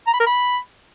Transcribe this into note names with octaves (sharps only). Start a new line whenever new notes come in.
A#5
B5
A#4
B5